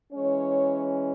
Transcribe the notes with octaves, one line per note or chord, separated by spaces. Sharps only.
E3 G#3 C#4 C#5